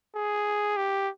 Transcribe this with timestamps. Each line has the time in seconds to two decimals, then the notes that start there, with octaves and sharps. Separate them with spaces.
0.15 G#4
0.77 G4